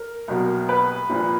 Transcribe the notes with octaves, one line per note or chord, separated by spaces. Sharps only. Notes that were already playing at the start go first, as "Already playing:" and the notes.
Already playing: A#4
C2 B2 F#3 A#3
B4
C2 A#2 F3